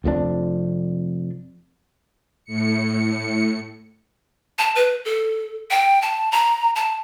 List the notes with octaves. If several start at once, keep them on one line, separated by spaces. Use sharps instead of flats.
F1 F2 A2 D4
A2 C#7
A5
B4
A4
G5
A5
A#5
A5